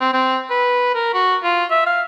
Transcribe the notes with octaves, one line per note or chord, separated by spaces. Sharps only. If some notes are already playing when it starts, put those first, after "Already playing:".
C4
C4
B4
A#4
F#4
F4
E5
F5